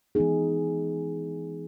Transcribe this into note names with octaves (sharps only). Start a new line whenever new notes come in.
E3 G#3 B3 D#4 G#4